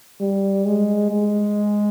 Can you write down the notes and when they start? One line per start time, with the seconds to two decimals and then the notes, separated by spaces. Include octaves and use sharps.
0.21 G3
0.65 G#3
1.10 G#3